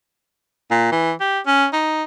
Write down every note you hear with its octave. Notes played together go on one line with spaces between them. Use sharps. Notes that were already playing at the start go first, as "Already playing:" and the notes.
A#2
E3
G4
C#4
D#4